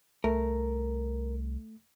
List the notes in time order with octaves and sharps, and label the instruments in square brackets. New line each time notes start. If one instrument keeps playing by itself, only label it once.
[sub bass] C2 [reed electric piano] A3 [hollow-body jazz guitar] A#4